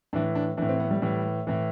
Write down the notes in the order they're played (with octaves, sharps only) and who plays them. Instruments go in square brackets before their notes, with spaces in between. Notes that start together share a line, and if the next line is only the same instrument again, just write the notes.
[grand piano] A2 E3 D4
D4
A2 E3 D4
C4
B3
G3
A2 E3
A2 E3